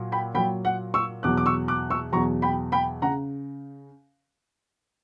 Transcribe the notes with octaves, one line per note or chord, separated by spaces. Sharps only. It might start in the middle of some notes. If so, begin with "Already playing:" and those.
Already playing: A#2 F#3
G5 B5
A#2 F#3 G5 B5
F#5
C#6 E6
E2 B2 F#3 D6 F#6
D6
C#6 E6
D6 F#6
C#6 E6
E2 B2 F#3 A#5 C#6
G5 B5
G5 B5
C#3 F#5 A#5